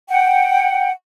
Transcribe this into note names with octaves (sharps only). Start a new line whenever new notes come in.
F#5 G5